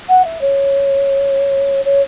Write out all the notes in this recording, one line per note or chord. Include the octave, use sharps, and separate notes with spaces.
F#5
E5
C#5
C#5